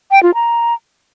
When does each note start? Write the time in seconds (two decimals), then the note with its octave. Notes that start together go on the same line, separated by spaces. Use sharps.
0.11 G5
0.23 F4
0.34 A#5